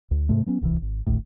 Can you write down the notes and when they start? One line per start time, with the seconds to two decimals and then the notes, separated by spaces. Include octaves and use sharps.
0.11 D2
0.29 G#2 C3 A3
0.46 F#3 B3 C#4
0.61 D1 C2 C3 E3
0.82 G#1
1.07 D#1 G#1 D2 A2